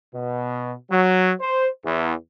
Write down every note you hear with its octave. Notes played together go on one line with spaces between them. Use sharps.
B2
F#3
C5
E2